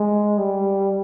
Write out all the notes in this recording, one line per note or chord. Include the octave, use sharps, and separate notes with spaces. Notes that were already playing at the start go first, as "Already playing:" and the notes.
Already playing: G#3
G3